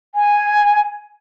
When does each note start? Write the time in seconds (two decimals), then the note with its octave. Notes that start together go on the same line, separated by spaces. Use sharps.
0.15 G#5